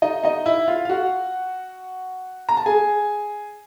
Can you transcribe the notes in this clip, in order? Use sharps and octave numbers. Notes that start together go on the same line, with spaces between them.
D#4 D#5
D#4 D#5
E4 E5
F4 F5
F5
F#4 F#5
A#5
A5
G#4 G#5